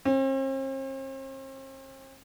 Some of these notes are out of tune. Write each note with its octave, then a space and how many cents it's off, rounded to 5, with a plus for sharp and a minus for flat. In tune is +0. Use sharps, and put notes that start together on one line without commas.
C4 +45